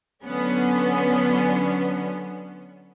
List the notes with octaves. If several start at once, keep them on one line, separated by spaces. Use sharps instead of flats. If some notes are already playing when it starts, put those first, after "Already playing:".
D3 F#3 B3 C#4